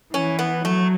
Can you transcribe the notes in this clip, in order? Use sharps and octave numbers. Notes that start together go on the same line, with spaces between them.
E3 C#4
B3
F#3 A3